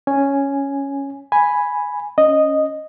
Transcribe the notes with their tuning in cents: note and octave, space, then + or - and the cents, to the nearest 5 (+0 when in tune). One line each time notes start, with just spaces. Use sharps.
C#4 +0 G#5 +0
G#5 +0 B5 +0
C#4 +0 D#5 -5